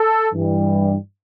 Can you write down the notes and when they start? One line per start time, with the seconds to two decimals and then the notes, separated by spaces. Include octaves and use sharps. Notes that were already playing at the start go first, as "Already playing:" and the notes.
Already playing: A4
0.33 G2 E3 G3